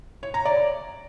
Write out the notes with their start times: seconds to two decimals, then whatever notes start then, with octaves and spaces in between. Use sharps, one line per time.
0.23 C#5
0.34 A#5
0.45 D5